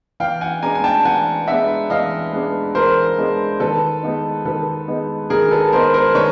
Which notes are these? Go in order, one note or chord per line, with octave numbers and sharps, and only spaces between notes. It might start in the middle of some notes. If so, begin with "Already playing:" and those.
E3 F5 G5
F#5 G#5
G#3 B3 D4 G#5 A#5
G#5
G5 A5
E3 F#5 G#5
G#3 B3 D4 E5 F#5
E3 D#5 F5
G#3 B3 D4
E3 A#4 C5
G#3 B3 D4
D#3 A4 B4
G#3 B3 D#4
D#3 A4 B4
G#3 B3 D#4
D#3 G#4 A#4
A4 B4
G#3 B3 D#4 A#4 C5
A#4 C5
D#3 B4 C#5